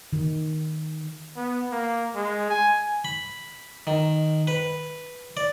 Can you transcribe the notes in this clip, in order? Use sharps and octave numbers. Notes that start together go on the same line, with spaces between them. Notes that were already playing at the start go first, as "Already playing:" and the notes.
D#3
B3
A#3
G#3
G#5
B5
D#3
B4
D5